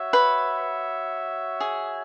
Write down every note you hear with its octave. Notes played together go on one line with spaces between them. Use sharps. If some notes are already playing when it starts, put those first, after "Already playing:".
Already playing: F#4 C#5 E5
B4
G#4